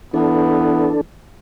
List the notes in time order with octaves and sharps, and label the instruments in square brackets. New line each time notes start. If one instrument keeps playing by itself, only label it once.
[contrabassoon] E3 [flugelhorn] B3 [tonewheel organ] D4 A4